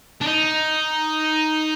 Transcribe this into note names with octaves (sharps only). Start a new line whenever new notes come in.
D4
D#4